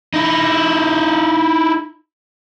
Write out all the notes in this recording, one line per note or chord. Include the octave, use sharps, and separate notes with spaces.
D#4 E4